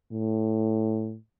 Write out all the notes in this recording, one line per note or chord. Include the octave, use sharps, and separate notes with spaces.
A2